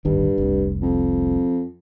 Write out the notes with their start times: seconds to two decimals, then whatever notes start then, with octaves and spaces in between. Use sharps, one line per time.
0.05 D1 G1 G2 D#3
0.38 F1 C2
0.82 F2